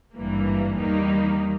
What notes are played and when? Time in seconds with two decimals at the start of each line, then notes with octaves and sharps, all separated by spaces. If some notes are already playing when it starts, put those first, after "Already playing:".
0.15 G#1 G2 E3 G3 A#3
0.77 E2 D#3 G3 A#3 D#4